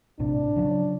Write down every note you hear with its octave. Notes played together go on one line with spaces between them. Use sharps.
A#1 A2 C3 D4
C#3 F3 F#3